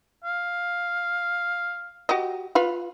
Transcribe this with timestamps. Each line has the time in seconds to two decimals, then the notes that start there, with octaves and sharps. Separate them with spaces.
0.24 F5
2.09 F#4 G4 D#5
2.55 F4 B4 F5